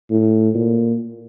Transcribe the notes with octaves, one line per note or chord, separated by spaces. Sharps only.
A2
A#2